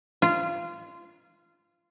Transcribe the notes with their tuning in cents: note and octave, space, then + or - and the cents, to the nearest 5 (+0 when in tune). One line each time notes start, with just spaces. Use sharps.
F4 -20